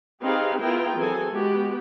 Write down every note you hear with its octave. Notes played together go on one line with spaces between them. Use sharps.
C4 D#4 G4 G#4 B4 F5
B3 E4 F4 G#4 A#4 G5
E3 F#3 C4 G#4 A4 G#5
G#3 B3 F#4 G4